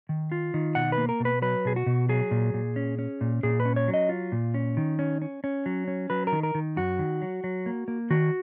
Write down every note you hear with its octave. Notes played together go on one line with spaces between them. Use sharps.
D#3
F4
D#3
B2 F#5
B4
A#3
A#4
B2
B4
F#3 B4
B2 G#4
F#4
B2
F#3 G#4
A#2
A#2
C#4
C#4
A#2
A#2 G#4
B4
C#4
C#5
F#3
D#5
F4
A#2
C#4
D#3
C#4
C#4
C#4
F#3
C#4
F#3 B4
A#4
D#3
A#4
D#3
F#2 F#4
D#3
F#3
F#3
A#3
A#3
D#3 F#4